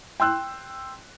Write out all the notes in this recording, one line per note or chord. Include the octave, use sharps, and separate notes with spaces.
G5 C6 E6 F#6